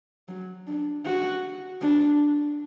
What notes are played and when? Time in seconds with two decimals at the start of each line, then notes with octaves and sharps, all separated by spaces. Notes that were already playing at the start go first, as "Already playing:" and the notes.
0.28 F#3
0.67 D4
1.05 F#4
1.81 D4